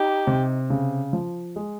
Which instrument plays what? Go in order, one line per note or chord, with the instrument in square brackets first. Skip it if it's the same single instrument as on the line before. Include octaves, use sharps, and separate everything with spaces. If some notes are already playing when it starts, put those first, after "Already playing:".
Already playing: [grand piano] D#4 [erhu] G4
[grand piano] C3
C#3
F3
G#3